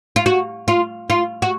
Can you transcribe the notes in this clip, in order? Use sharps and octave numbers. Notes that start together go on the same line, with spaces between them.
F4
F#4
F4
F4
F#4